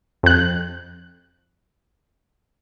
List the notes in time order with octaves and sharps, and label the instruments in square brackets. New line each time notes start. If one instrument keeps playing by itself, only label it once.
[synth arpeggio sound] F2 F#6